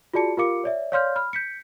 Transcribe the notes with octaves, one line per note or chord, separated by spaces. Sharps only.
F4 F#4 G#4 D5 A5 C#7
F4 G4 A#4 F5 D6 C#7
C#5 D5 E5
C#5 D5 F5 C6 F6 G6
B5 F6
G6 B6 C#7